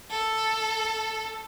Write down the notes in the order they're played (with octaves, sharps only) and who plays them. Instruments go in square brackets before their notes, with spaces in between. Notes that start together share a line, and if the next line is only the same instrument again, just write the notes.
[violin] A4